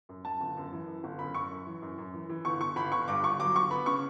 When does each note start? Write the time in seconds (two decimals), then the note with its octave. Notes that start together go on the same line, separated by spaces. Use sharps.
0.09 F#2
0.25 F#2 A5
0.41 G1
0.57 F#2
0.73 E3
0.87 F#2
1.04 G1
1.19 F#2 B5
1.34 F#2 C#6
1.50 F#2
1.67 E3
1.82 F#2
1.98 F#2
2.14 E3
2.30 E3
2.45 G1 C#6
2.61 G1 C#6
2.76 G1 B5
2.92 G1 C#6
3.08 G2 D6
3.24 G1 C#6
3.40 F#3 D6
3.56 G1 C#6
3.71 B3 B5
3.86 C#3 C#6